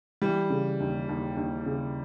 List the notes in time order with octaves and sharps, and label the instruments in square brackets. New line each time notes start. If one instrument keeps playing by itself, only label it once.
[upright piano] E3 [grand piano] G3
[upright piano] C#3
D#2
D#2
D#2
C#3